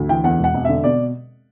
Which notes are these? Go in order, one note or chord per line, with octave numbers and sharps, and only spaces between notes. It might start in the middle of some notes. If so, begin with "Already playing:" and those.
Already playing: D2
E3 G5
E2 F#5
E1 F#5
E1
D3 E5
B2 D5